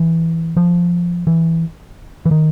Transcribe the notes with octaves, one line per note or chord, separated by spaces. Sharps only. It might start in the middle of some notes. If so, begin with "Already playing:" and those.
Already playing: E3
F3
E3
E3
D#3